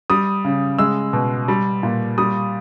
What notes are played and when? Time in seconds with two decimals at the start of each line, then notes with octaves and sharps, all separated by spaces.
0.10 G3 D#6
0.45 C#3
0.79 G#3 E6
1.13 B2
1.48 G3
1.83 A#2
2.18 G3 D#6